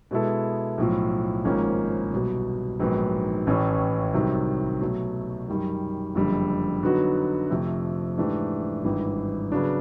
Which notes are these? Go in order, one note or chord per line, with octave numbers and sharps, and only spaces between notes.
B2 G#3 B3 E4 A4
B1 A2 F3
G#1 G#2 F3 A#3 C#4
C2 B2 F#3
A#1 G#2 D#3 F#3 B3
A1 A2 E3 A3 C#4
C2 C3 D#3 F#3
B2 F#3 A3
F#2 D#3 G3
F#1 F2 D3 G3
D3 F#3 B3 D#4 F#4
F2 C3 F3 A3
G#2 E3 A3 D4 G4
G#1 G2 E3
C#3 F#3 B3 D4